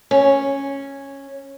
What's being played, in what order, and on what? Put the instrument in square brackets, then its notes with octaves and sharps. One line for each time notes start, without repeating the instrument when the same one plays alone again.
[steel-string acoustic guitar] C#4